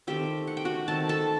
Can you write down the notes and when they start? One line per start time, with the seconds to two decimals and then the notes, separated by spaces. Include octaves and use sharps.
0.07 D#3 A3 C4 G4 G5
0.47 F#5
0.57 G5
0.65 F#4 F#5
0.88 D#3 A3 C4 A5
1.09 A4 A5